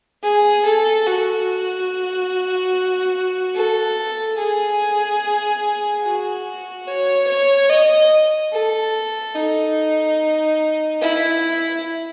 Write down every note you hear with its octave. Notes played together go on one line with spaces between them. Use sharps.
G#4
A4
F#4
A4
G#4
F#4
C#5
C#5
D#5
A4
D#4
E4